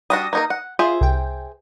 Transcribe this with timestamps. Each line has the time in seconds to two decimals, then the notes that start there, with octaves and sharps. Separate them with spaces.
0.10 G3 D4 F#4 D#6 A#6
0.33 A#3 D#4 A#4
0.50 F#5
0.79 F4 G#4 C5 E5
1.01 C2 G5